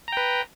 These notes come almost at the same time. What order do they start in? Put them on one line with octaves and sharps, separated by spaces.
A#5 G5 B4